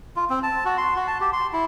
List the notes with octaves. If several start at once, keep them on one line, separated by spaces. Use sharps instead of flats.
F4
C4
A5
F#4
C6
F#4
A5
G4
C6
E4